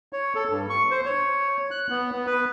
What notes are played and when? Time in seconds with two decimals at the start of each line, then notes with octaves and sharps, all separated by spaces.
0.13 C#5
0.35 A4
0.49 G2
0.70 C#6
0.91 C5
1.06 C#5
1.71 F#6
1.90 B3
2.12 B3
2.27 B4